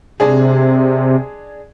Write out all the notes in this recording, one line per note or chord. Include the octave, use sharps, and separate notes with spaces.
C3 G#3 D4 G#4